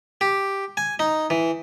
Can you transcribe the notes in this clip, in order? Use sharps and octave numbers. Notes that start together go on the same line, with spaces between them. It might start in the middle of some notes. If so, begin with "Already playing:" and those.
G4
G#5
D#4
E3